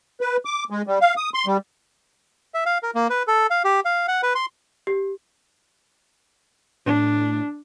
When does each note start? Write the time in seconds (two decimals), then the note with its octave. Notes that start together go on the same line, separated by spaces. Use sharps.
0.21 B4
0.45 D6
0.70 G#3
0.87 G3
1.01 F5
1.17 D#6
1.34 C6
1.46 G3
2.54 E5
2.66 F5
2.83 A#4
2.95 A#3
3.10 B4
3.27 A4
3.50 F5
3.64 G4
3.85 F5
4.08 F#5
4.23 B4
4.35 C6
4.87 G4
6.86 A2 D4